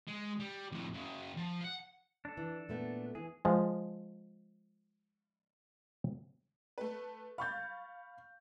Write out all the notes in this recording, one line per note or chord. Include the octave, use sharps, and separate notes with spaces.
G#3
G3
F2 A2
F#2 C#3
F3
F5 F#5
D4 A4
E3
A#2 A3 B3
E3 G#4
F3 G#3
A3 B4
F5 B5 C#6 G6 A6